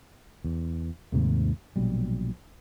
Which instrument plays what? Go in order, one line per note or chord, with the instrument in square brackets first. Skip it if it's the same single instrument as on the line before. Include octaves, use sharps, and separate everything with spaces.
[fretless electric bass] E2
D#2 G#2 C3 A3
A#1 B2 F#3 G3